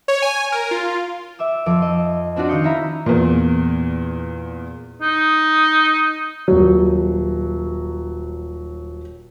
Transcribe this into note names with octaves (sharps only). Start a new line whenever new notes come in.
C#5
G#5
A#4
F4
E5 D6 E6
F2 F3 D6 E6
D#5
C4 D4 F4 F#4 D5
D#3 F5 C#6 D#6 G6 C#7
C#4 E4 E5 A#5 B5
E2 A#2
D#4
D#1 F#3